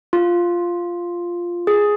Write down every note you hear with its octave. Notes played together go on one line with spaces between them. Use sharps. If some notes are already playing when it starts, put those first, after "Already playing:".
F4
G#4